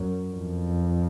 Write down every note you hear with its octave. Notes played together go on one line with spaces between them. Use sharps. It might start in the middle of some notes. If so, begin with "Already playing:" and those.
Already playing: F#2
F2